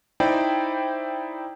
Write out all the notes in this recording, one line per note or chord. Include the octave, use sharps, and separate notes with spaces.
D#4 E4 C5 D5 G5